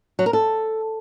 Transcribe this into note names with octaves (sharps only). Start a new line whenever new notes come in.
F#3
A#4
A4